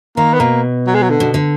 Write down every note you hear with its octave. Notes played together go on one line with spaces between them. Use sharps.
D#3 A#3
B3
B2 A#3
F#3
G#3
F#3
D3
B2
D3